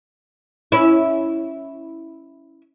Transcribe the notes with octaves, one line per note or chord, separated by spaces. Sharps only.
C#4 E4